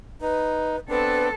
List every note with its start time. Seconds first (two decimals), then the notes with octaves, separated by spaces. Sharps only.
0.21 D#4 B4
0.89 B3 C4 D4 A4 B4